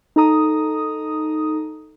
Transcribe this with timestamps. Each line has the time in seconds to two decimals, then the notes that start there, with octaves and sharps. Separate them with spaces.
0.16 D#4 A4 A#5 D#6